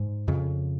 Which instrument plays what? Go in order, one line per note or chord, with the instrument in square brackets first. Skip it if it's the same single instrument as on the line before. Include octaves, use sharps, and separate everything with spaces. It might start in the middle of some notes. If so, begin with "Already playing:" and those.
Already playing: [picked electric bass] G#2
F2 C#3